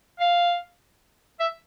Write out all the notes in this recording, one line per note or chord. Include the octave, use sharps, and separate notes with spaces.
F5
E5